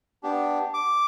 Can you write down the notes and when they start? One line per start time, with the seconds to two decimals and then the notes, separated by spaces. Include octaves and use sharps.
0.23 B3 D4 G4
0.74 D6